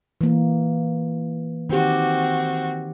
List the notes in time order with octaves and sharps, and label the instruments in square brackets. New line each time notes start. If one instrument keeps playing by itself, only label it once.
[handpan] E3 A#3
[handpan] D#3 G4 [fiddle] C4 F#4